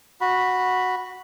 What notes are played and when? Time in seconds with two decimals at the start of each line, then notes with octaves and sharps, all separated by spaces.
0.21 F#4 B5